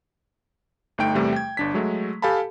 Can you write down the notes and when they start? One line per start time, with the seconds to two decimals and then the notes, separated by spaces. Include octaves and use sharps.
0.98 G1 A3 D#4 G5 D7
1.15 E2 C3 G3 A3
1.32 G5 G#6
1.57 G1 D4 B6
1.74 F#3 G#3 A3
2.22 G4 A4 F5 G#5 A5 B5